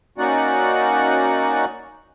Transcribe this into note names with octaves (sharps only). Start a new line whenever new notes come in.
A#3 C#4 D#4 F#4 D5 F#5